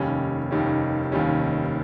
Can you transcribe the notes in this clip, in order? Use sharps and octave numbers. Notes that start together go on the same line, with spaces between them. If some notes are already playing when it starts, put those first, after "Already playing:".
Already playing: F1 D#2 D#3 G3 C#4
F1 D#2 D#3 G3 C#4
F1 D#2 D#3 G3 C#4